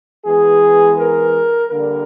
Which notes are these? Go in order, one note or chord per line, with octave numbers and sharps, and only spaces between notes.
E3 G#3 B3 G#4
A#4
D3 G3 A#3 A#4